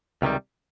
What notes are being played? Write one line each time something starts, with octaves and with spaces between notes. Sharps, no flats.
C#2 C3 D#3 G3